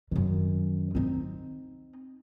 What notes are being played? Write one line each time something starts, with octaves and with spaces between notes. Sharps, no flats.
F#2 D#3
C4 D#4